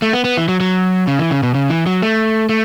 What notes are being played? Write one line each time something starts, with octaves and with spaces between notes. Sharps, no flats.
A3
B3
B3
E3
F#3
F#3
C#3
E3
C#3
B2
C#3
E3
F#3
A3
A3